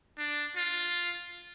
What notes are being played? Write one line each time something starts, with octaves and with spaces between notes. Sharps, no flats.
D4
F4